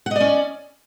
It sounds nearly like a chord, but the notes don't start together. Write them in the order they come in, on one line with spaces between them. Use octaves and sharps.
F#5 D#5 D5 C#4